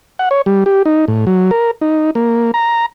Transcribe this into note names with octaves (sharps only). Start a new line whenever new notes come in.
F#5
C#5
G3
G4
D#4
A2
F#3
A#4
D#4
A#3
A#5